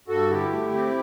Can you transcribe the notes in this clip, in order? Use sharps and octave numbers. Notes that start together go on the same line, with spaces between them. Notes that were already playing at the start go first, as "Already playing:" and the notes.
G2 F#4 A4
D3 E4 G4
A3
C4